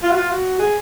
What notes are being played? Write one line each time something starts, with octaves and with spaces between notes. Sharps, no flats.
F4
F#4
F4
F#4
G#4